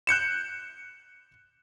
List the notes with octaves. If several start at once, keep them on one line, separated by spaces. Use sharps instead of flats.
F#6 G6 C#7 E7